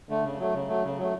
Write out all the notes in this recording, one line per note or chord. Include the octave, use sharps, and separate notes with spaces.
D3 A3
C#3
F#3 A3
C#3
F#3 A3
C#3
F#3 A3